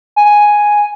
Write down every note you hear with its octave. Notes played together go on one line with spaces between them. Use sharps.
G#5